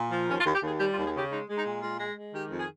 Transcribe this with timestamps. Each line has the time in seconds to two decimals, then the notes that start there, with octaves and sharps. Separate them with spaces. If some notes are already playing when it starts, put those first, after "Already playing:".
Already playing: A#2
0.11 F3
0.28 D#2 C#4
0.41 F4
0.45 D#2
0.54 G4
0.62 D#2 G#4
0.80 G3 G4
0.92 F4
0.97 D#2
1.05 G#4
1.14 C#3 G4
1.31 G#3 D#4
1.48 G#3
1.57 D#4
1.65 A#2
1.82 G#3 F4
2.00 G#3
2.17 G#3
2.34 D#3 G4
2.51 F2
2.60 G#4